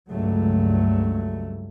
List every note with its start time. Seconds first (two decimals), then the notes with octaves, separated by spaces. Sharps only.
0.12 C#2 G2 F#3 A3